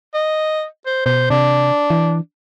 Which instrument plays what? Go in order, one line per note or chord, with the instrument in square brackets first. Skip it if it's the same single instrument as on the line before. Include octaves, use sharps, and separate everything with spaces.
[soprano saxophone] D#5
C5
[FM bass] B2 [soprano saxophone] C5
[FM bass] C3 [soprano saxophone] D4
[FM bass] E3